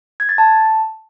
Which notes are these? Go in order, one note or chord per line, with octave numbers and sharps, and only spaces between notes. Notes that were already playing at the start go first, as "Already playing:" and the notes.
G#6
A6
A5